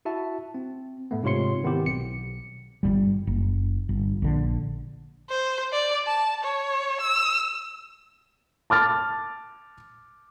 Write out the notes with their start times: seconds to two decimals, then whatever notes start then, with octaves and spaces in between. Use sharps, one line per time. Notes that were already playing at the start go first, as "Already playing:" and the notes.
0.05 E4 F#4 E5 A5
0.55 C4
1.11 A2 A3 B3
1.23 G#2 C3 F4 C#5 C6 C#7
1.63 D#3 B3 C4 E4 G4
1.86 B1 C#7
2.83 G1 C2 G3
3.27 F#1
3.89 G1
4.22 A#1 D3
5.29 C5
5.72 D5
6.07 A5
6.43 C#5
7.01 E6
8.70 A5 D6 F6 A6